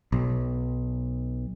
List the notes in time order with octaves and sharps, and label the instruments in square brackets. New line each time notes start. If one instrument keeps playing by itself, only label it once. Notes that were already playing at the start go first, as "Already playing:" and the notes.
[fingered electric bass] B1